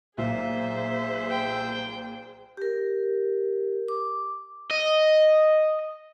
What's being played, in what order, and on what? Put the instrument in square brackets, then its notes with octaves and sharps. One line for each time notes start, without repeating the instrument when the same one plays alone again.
[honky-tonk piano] B1 A#2 [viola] G#4 C5 [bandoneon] E5
[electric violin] G5
[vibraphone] G4 A#4
D6
[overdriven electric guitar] D#5